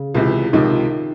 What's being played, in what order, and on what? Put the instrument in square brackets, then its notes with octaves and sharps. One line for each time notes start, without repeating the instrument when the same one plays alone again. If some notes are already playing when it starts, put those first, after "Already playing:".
Already playing: [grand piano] C#3
[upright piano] C#2 C3 E3
[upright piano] C#2 C3 F3 [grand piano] D#3